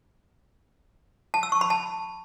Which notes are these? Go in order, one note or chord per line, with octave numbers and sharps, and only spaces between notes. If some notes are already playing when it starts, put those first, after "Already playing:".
A5
E6
C#6
B5
A5